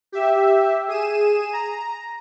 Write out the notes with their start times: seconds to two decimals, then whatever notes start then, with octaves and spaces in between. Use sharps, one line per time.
0.12 G4 E5
0.88 G#4 D#7 E7
1.53 A#5